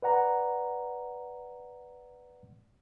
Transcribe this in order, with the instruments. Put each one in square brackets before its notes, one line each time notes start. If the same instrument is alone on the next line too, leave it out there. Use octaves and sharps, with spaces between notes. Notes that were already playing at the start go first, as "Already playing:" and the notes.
[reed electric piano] B4 D5 F#5 A#5